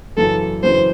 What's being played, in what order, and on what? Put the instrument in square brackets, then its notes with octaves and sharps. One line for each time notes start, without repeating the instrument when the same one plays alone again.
[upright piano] F#2 C#3 E3 [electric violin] A4
[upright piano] F#2 C#3 E3 [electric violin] C5